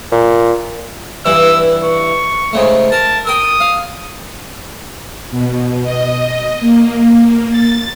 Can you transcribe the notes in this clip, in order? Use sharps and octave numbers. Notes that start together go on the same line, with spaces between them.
A#2
G2 E3 E4 E6
C#6
G#2 C#3 A3
A#4 A5
A#4 G5 D#6
F5
B2
D#5
A#3
A6